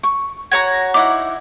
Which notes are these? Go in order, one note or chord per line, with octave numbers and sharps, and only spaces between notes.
C#6
F#4 C#5 A#5 G#6
D#4 E4 F#5 D6